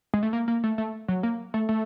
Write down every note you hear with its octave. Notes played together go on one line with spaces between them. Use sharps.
G#3
A3
A#3
A#3
A3
A3
F#3
A#3
A3
A3